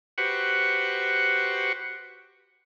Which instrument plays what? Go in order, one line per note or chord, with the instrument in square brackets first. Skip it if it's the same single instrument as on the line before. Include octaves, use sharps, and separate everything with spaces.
[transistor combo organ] F#4 G4 B4 C5 F#5 C#6